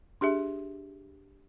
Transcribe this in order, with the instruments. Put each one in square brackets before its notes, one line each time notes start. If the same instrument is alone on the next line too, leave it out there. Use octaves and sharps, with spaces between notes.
[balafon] D4 G4 G#4 E5